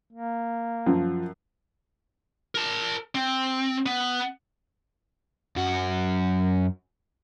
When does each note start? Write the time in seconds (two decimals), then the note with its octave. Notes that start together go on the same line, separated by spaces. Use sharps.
0.13 A#3
0.87 F#2 F3
2.55 A#4 A5
3.15 C4
3.86 B3
5.56 F#2 F#4